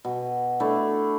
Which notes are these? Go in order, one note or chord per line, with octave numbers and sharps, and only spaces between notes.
B2
A3 D4 E4